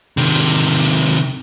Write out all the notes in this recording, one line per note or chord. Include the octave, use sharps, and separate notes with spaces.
C3 D#3